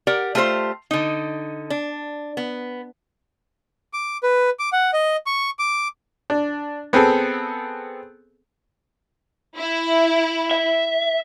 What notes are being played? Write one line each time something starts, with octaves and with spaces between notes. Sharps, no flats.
G4 A#4 D5 F#5
A3 F4 G4 A#4 C5
D3 D#4
D4
B3
D6
B4
D6
F#5
D#5
C#6
D6
D4
B3 C4 G#4 A4
E4
E5